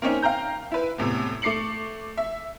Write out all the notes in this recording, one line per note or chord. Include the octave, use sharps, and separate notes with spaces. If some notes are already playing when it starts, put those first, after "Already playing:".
A#3 C4 C#4 D#4
F5 G5 A#5 G6
E4 B4
E2 A2 C3
A3 D6 C7 C#7 F#7
E5